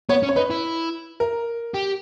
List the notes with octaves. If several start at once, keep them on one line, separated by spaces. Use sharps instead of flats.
B3 C#5
C#4
C#5
D#4 B4
E4
A#4
G4